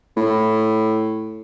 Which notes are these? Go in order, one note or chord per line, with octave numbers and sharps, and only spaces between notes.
A2